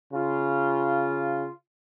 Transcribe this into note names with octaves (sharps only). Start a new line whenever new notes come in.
C#3 F4